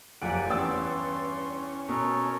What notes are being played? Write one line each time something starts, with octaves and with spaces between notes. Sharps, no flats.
F#1 F2 A#3 G4 D5 F#5 G#5 D7
E2 G2 B3 C#4 G5 C6 E6 A6
B2 A4 A#4 C#5